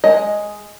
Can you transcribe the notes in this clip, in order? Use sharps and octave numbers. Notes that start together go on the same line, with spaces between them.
G#3 D#5